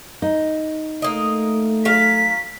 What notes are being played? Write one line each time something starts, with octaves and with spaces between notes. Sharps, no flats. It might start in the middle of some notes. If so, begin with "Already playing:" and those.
D#4
A3 A#3 D#5
F#3 F5 B6